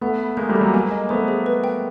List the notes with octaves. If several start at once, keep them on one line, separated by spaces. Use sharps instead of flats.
A3 B3 F#5
B5
G#3 A#3 G6
G3 A3
B5
F#3 G#3
G#3 A#3 G#5
D#5
A3 B3 C5
G#4
B4
G5